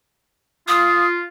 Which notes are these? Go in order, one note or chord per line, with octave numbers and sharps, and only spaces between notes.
F4 D#6